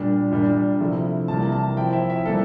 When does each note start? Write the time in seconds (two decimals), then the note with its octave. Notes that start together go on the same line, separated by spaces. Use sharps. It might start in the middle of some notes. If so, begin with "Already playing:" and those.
Already playing: A#2 G3 D4
0.31 A#2 G3 D4
0.80 C3 F3 A3 E4
1.28 C3 E3 G3 A#3 A5
1.52 A5
1.77 F3 C4 E4 G5
1.93 E5
2.10 E5
2.25 E3 G3 A#3 A4